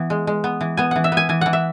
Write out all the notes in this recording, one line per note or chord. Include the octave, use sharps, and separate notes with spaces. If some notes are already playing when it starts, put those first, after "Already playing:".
Already playing: E3 B3
G#3
G#3
B3
E3
B3 G#5
E3 F#5
E5
B3
G#5
E3 G#5
E3 F#5
E5